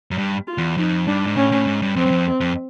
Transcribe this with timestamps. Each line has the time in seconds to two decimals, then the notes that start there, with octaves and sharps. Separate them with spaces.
0.11 F#2
0.18 G2
0.47 F4
0.58 E2
0.78 F2 D#4
1.07 G2 D4
1.27 G#2
1.37 A2 C#4
1.52 A2
1.67 G#2
1.82 G2
1.96 F2 C4
2.05 F#2
2.11 F2
2.41 F2